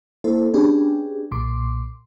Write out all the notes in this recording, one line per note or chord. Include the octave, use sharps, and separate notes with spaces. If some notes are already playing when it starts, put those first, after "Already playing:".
A#3 E4 A4 C5
B3 C#4 D4 G4 G#4
B1 A#2 C6 D6